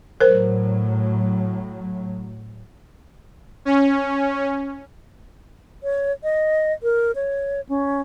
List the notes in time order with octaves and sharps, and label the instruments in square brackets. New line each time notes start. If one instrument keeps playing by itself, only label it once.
[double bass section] A2 F#3 [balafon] A#4 C5
[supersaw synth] C#4
[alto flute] C#5
D#5
A#4
C#5
C#4